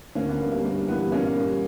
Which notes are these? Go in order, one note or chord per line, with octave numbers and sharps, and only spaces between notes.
D2 A#3 C#4
B3
D3 G3
A#3
G2 A#3
E3 G3 B3
A#2 A#3 C#4
G3